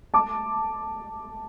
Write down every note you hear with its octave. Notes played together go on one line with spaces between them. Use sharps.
A5 D6